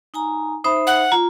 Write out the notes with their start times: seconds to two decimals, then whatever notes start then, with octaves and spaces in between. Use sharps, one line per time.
0.14 D#4 G#5 A#5
0.64 D#4 C5 E5 B5 D#6
0.87 F#5
1.12 F4 A#5